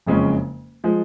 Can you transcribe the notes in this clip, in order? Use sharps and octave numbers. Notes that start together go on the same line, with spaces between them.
F#1 F2 C#3 G#3 C#4
F3 G#3